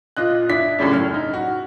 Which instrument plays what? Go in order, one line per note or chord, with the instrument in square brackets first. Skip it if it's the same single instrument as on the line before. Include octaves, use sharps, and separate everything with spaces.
[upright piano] A#2 F4 D#5 F#6
D4 E4 B6
F#2 A2 C#3 D4
F6
D#4
F#4